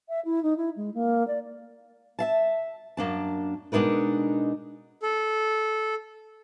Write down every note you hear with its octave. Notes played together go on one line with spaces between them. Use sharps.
E5
E4
D#4
E4
G#3
A#3
D5
E5 F5 A5
F#2 A#3 D4 A5
B2 G#3 D4 D#4 A#4 B4
A4